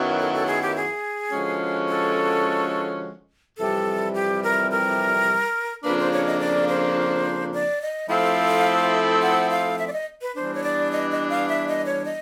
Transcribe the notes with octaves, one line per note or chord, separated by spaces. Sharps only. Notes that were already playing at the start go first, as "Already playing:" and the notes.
Already playing: F#2 D#3 F#3 B3 E4
A4
A4
G#4
G4
G#4
D3 F3 G#3 C#4 F#4
A4
F2 C3 E3 G3 A4
G4
A#4
A#4
F2 C#3 F3 A#3 D4 B4
C5
C#5
D#5
D5
C5
D5
D#5
F3 A3 C4 E4 A4 F5
F#5
F5
E5
D5
D#5
B4
E3 G3 B3 D4 C5
C#5
D5
D#5
D#5
F5
E5
D#5
C#5
D#5